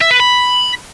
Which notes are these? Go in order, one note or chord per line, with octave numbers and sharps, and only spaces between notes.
E5
B4
B5